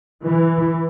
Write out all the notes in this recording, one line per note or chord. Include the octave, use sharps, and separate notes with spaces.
E3